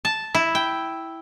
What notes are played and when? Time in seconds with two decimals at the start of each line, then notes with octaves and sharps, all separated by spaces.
0.05 A5
0.34 E4
0.55 G5